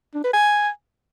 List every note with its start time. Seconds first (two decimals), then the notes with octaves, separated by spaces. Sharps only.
0.15 D4
0.24 B4
0.33 G#5